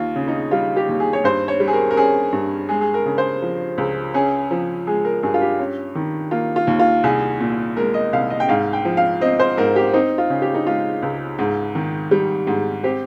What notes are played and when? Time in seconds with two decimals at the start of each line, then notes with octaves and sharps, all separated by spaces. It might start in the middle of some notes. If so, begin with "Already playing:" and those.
Already playing: D#2 F4
0.16 C#3
0.28 D#4
0.51 G3 F4
0.76 G4
0.89 D#2
1.00 G#4
1.13 C#5
1.24 G2 C5
1.48 C#5
1.60 G3
1.68 G#4
1.73 A#4
1.91 A#4
1.97 C#4 G#4
2.32 G2
2.69 G#3 G#4
2.81 G#4
2.94 A#4
3.05 C#3
3.18 C5
3.42 F3
3.78 C#2
4.14 C#4 G#4
4.51 F3
4.87 G#3 G#4
5.05 A#4
5.23 G2 G#4
5.34 F4
5.41 G4
5.60 C#4
5.95 D#3
6.31 A#3 F4
6.56 F4
6.67 D#2
6.79 F4
7.03 C2 G#4
7.40 A#2
7.77 G#3 A#4
7.94 D#5
8.13 C2 F5
8.30 D#5
8.40 G5
8.48 G#2 F5
8.73 G5
8.85 F3
8.97 F5
9.21 C4 D#5
9.40 C5
9.57 G#2 A#4
9.76 G4
9.93 C4 D#4
10.18 F4
10.30 C#3
10.42 G4
10.54 D#4
10.66 G#3 F4
11.02 C#2
11.39 G#2
11.75 D#3
12.11 G3
12.47 G#2
12.84 C4 G4